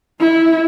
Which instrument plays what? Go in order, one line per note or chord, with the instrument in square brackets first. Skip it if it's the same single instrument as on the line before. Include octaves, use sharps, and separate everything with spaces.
[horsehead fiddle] E4